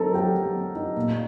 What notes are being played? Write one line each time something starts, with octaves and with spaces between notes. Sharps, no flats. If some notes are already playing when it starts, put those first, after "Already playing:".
Already playing: F#3 C4 D#4 A4 A#4 A5 A#5
F#3 G4 G5
F#3
C4
D#4
A#2